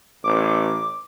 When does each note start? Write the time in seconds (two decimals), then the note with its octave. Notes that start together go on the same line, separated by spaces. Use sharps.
0.24 A1 D6